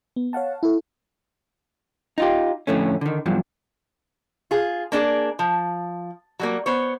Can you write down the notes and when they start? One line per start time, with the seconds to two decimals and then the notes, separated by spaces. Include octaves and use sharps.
0.16 B3
0.33 C#5 F5 F#5 A5
0.63 E4 A4
2.18 D#4 F4 G4
2.67 F2 A2 D3 A3 C#4
3.01 D3 D#3
3.26 E2 G2 F3 F#3
4.51 F4 G#4
4.92 A#3 D4 G#4
5.39 F3
6.39 F#3 G3 A#3
6.66 B3 C5 C#5